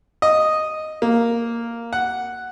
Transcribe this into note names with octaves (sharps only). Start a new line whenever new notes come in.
D#5
A#3
F#5